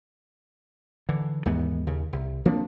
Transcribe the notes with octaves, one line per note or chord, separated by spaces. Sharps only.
D3 E3
D#2 G#2 E3 B3
D#2 C#3
C2
F3 A#3 C4 D4